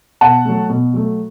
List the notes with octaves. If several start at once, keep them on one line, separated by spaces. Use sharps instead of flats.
B2 F#5 A5
F#3 A3
B2
F#3 A3